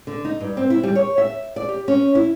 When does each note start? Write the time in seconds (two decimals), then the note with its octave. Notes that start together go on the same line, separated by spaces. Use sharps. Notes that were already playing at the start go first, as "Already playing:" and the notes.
0.07 D3
0.25 D#4
0.40 G2
0.57 C4
0.70 E4
0.83 G3
0.95 C#5
1.18 E5
1.56 D5
1.69 G4
1.88 C#4
2.15 E4